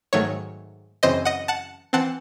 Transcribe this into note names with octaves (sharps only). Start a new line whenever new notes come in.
G#2 D#3 F#3 A3 C#5
F#2 C#3 E3 C4 C5 D#5
D#5 F#5
F#5 A5
E3 C4 F#5 A5